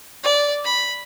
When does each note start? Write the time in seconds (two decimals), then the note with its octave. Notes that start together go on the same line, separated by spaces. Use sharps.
0.24 D5
0.65 B5